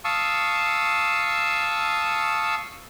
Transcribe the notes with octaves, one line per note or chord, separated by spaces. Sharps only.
F5 A5 C#6 D#6 E6